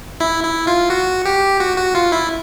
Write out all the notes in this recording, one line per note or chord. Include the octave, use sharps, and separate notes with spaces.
E4
E4
F4
F#4
G4
F#4
F#4
F4
E4